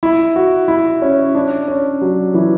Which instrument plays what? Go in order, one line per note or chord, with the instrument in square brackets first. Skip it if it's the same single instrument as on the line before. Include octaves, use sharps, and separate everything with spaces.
[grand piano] E4
F#4
E4
C#4
D4
C#4
F#3
E3